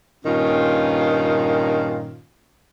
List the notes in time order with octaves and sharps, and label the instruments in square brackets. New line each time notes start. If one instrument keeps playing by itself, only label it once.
[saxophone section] G2 A#2 D#3 C#4 F4